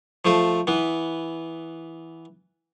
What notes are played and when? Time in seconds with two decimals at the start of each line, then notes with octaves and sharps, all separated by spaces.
0.25 F3 A3 C5
0.67 E3 B3